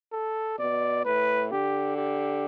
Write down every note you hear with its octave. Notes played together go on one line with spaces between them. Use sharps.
A4
B2 D5
A2 B4
D3 G4
G4